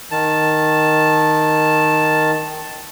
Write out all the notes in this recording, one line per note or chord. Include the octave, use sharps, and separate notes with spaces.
D#3 A5